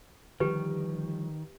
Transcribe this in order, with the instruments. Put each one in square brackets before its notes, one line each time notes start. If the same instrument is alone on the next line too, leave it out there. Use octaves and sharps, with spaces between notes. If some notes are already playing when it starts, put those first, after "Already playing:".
[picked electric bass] D3 F3 G3 [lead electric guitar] D#3 [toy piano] G4 B4